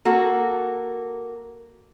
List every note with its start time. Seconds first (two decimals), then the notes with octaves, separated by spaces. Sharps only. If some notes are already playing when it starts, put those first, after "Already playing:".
0.05 A#3 F#4 A4